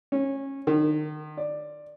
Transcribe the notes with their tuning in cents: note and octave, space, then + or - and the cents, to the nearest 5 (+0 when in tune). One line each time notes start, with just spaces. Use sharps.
C#4 -20
D#3 -35
D5 +10